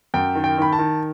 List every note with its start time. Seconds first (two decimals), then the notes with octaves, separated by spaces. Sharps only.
0.14 F#2 G5
0.35 D#3
0.44 G5
0.58 D#3 B5
0.73 A5
0.79 D#3